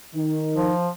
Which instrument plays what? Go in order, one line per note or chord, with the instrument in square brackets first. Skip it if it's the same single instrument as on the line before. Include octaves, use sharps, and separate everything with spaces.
[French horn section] D#3 [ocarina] D#4
[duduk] F3